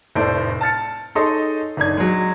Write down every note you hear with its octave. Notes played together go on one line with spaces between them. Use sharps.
F1 A2 A3 C5 D5 D7
A5 F6 A6 C#7
D#4 G#4 A4 C#5 D#5 C6
F#1 D4 D#4 G#6
F#3 G#3